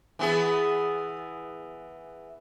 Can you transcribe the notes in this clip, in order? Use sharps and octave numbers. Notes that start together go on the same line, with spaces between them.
E3 B3 G#4